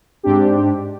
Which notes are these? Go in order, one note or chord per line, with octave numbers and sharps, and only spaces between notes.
G#2 C4 D4 G4